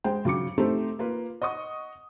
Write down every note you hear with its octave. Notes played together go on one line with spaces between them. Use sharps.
G#3 C5 G5
C#3 F#3 D6 C#7
A3 C4 D#4 G4 A4 C5
A#3 F4 B4
D#5 F#5 C#6 D#6